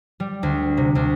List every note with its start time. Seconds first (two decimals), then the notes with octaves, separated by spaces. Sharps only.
0.20 G3
0.43 D2
0.77 C3
0.95 D2